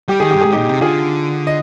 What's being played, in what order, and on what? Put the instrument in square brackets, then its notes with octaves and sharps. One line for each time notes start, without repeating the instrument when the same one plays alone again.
[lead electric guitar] G3 [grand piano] G4
[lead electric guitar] D#3 [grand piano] G#4
[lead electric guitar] G2 [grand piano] G4
[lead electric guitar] G#2 [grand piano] G#4
[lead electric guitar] A#2 [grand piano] D#4 G4
[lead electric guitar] C3
[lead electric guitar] D3 [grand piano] F4 G#4
[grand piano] D#5